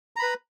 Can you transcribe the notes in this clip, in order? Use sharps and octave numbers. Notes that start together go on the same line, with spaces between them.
B4 A#5 B5